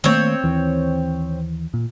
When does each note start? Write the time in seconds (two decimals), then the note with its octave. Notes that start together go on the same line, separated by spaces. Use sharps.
0.04 D#3 A3 A#3 C4 C#5
0.44 D#2 E3
1.74 A#2